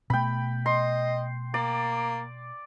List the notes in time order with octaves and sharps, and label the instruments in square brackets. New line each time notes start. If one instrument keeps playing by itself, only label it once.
[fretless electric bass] B2 A3 [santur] G5 B5
[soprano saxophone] D#5 [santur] C6
[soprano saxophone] A#3 [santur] D5